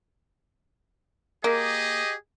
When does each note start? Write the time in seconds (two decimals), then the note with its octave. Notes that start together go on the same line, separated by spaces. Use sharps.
1.44 A#3 G4 G#4 D#5